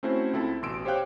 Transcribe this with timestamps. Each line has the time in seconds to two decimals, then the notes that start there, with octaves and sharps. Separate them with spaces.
0.03 A3 C4 C#4 E4 F#4 C5
0.33 C#2 C4 E4 A4
0.62 A1 B2 C6 E6 D7
0.85 G4 C5 C#5 F5 G5 F#6